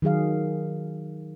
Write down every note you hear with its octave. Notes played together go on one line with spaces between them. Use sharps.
D#3 F#3 G#4 F5